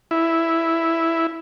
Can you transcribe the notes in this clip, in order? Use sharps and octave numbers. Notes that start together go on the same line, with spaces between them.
E4